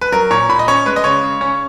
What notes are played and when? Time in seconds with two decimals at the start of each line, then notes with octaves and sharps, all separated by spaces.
0.01 B4
0.12 F#3 A#4
0.31 A#2 C#5
0.49 A#2 B5
0.59 D#5
0.68 C#4 C#5
0.86 G#3 B4
0.96 D#5
1.04 C#3 C#5
1.23 C#3
1.41 C#4